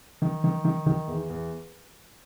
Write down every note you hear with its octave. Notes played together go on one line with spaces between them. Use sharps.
D#3
D#3
D#3
D#3
E2
E2